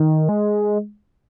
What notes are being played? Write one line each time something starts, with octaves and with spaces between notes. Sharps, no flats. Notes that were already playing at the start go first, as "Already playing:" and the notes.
Already playing: D#3
G#3